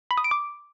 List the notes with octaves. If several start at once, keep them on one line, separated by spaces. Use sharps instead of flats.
B5
D#6
D7
D6